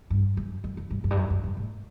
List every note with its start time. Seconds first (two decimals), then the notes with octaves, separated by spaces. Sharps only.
0.10 G2
0.37 F#2
0.64 F#2
0.77 F#2
0.90 G2
1.04 F#2
1.11 G2
1.17 F#2
1.30 F#2
1.44 G2
1.57 A2